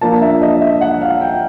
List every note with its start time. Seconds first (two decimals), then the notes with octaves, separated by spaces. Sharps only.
0.01 F3 A#3 D4 F4 A5
0.22 E5
0.42 D#5
0.61 E5
0.81 F#5
1.02 F5
1.21 G5